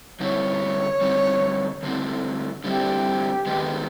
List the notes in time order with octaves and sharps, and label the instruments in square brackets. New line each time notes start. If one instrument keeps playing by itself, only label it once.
[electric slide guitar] D3 G3 C4 E4 [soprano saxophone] C#5
[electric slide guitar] D3 G3 C4 E4
D3 G3 C4 E4
[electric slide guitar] D3 G3 C4 E4 [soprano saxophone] G4
[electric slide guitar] D#3 G#3 B3 D#4